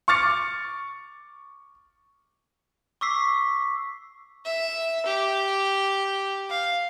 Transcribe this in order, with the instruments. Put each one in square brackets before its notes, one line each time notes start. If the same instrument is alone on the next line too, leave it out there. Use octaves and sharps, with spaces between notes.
[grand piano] C#6 D6 F6 A6 C#7
[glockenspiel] C#6 D6 E6 B6 C7
[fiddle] E5
G4
F5